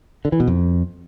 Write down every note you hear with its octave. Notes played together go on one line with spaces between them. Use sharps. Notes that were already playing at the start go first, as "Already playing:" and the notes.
D3
E3
B2
F2